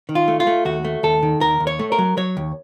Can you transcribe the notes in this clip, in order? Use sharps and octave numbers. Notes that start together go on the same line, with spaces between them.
D#3
F4
A3
F4
A3
D#2 F#4
A3
D#2 A4
D#3
D#2 A#4
D#2
C#5
A3
A#4
F#3
F#3 C#5
D#2